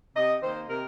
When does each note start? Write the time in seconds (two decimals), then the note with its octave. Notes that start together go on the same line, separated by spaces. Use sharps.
0.16 C3 D#5
0.42 D#3 A#3 C5
0.69 C3 A#4